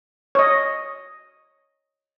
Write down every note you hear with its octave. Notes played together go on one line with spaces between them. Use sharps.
C#5 D#5